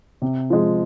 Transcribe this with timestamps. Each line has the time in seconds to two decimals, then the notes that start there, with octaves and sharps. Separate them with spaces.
0.22 C3
0.50 F3 G#3